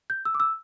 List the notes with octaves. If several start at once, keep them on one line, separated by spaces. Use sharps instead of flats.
G6
E6
D6
E6